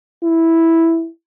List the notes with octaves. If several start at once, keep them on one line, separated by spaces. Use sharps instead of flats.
E4